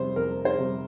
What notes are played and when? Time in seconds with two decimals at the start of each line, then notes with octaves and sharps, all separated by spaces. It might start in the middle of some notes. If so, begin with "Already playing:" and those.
Already playing: F2 C3 G3 C5
0.16 F2 A#4
0.45 C5
0.59 C3 G3